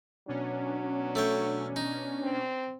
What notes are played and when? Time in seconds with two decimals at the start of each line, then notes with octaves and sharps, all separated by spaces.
0.27 B2 F#3 C#4 D4
1.15 A3 C#5 G5
1.76 D#4
2.22 C4